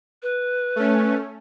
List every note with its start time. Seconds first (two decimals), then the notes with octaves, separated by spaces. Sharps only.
0.23 B4
0.76 A3 C#4